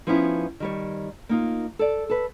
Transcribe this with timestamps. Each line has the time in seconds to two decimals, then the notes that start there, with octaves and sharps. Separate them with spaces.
0.07 F3 B3 C#4 D#4 E4
0.60 D#3 G3 C#5
1.29 A#3 D#4 F4
1.79 A4 D5
2.10 A4 B4